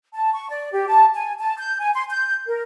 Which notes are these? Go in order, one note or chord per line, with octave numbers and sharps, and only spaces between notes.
A5
C#6
D5
G4
A5
G#5
A5
G6
G#5
C6
G6
A#4